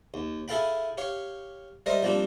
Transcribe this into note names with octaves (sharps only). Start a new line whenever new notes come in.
D#2
E4 G#4 A4 F5 G5 B5
G4 C#5 F5
G3 A#4 C5 D#5 E5
F3 G3 A#3 C4 D4